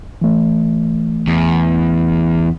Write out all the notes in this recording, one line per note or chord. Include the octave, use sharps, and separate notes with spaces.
E3 A3
E2